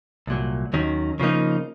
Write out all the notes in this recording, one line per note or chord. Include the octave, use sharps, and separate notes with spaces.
C2 A#2 F#3
D#2 D#3 F#3 C#4
C#3 F3 A#3 D#4